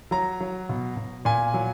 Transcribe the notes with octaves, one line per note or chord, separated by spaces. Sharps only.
F#3 A#5
F#3
B2
B2
A#2 G#5
F#3